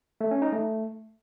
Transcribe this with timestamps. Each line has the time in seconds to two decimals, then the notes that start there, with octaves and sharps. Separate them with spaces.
0.21 A3
0.31 C#4
0.42 D#4
0.53 A3